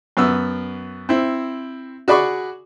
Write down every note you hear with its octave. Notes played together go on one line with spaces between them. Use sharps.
F#2 B3 E6
C4 E4
F#4 G#4 D5 B5 C#6 D6